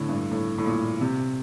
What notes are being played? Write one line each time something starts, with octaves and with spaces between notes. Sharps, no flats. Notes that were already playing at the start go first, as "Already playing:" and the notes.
Already playing: A2 D3
G2
A2
A2
A#2
C3